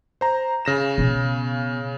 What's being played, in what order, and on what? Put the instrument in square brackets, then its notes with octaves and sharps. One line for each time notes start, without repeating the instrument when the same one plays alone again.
[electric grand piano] C5 A#5
C#3 A#6 E7
[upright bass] B2